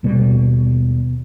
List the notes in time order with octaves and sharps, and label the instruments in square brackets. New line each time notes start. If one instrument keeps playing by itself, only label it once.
[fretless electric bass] D#2 B2 G3